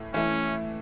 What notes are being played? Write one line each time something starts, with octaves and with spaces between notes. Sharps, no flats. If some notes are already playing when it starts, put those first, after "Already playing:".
Already playing: A2 E3 A3
E3 A3 C#4 E4